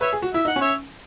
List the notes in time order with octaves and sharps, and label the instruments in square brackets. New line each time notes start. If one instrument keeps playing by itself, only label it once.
[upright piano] B4 [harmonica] C#5 E5
[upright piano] G#4
F#4
[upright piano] E4 [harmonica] E5
[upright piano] D#4 [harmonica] F#5
[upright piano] C#4
[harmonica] C#5 E5